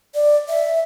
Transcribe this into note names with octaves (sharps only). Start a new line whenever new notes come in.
D5
E5